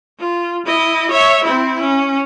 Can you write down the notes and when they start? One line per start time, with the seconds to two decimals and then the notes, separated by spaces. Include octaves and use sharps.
0.19 F4
0.66 E4 D#5
1.11 C#5 E5
1.44 C4 E4
1.80 C#4